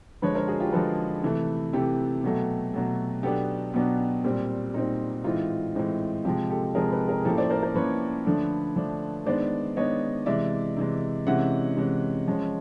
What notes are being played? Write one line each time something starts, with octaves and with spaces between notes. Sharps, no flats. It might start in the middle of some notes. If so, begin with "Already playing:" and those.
D3 F3 G#3 B4 C#5
A#4 C5
F#4 G#4
F4 G4
D3 F3 G#3 A4 B4
C3 E3 A3
C3 E3 A3 G4 A4
B2 F#3 A3
B2 F#3 A3
B2 F#3 B3 D4 G4 A4
B2 F#3 B3 D4
A#2 G3 C4
A#2 G3 C4 D#4
A2 E3 G#3 C4 D#4 F4
A2 E3 G#3 C4
C3 F3 G#3 F4 G4
G4 A4
C3 F3 G#3 G#4 A#4
A4 B4
G#4 A#4
G#4
A2 F3 A#3 C#4 G4 A4
C5 D5
A#4 C5
A#4 C5
A2 F3 A#3 C#4 B4 C#5
D3 F3 A3 D4
D3 F3 A3 D4
D#3 G#3 B3 D4 C5 D5
D#3 G#3 B3 D4 C#5 D#5
C3 E3 G#3 D5 E5
C3 E3 G#3
C3 E3 G#3 C#4 E5 F#5
C3 E3 G#3 C#4
F3 G#3 C#4